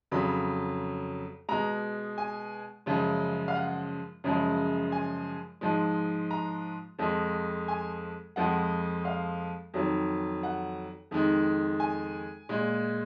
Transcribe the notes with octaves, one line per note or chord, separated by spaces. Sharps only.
F2 C#3 F#3 B5
B2 G#3 A#5
G#5
F#2 C#3 F3 G#3
F5
F#5
F#2 C#3 F3 G#3
G#5
G#2 F3 G#3
A#5
F2 F3 G#3
G#5
F2 F3 G#3 F#5
F5
F2 D#3 F#3
F#5
F2 D#3 G#3
G#5
A#2 G#3